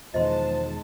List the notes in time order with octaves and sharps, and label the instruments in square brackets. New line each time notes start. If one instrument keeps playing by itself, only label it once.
[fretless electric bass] E2 B2 D#3 [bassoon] F3 [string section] G#3 A5 [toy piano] D#5 C6